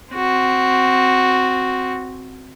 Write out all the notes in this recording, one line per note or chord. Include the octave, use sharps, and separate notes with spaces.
C4 F#4